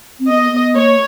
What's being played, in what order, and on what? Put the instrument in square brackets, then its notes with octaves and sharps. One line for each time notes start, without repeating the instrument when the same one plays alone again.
[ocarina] C4
[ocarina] B3 [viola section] D#5
[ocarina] B3
[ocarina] A#3 [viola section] C#5